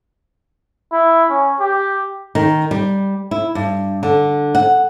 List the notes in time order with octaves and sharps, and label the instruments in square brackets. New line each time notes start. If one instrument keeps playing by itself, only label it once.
[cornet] E4
C#4
G4
[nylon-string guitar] D#3
G3
E4
G2
D3
F#5